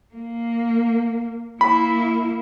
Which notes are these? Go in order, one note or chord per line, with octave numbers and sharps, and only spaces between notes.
A#3
A#3 E4 B5